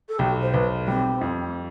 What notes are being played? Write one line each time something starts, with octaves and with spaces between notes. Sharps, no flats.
A4
B1 G4
C5
B1 B4
G3 C4
F2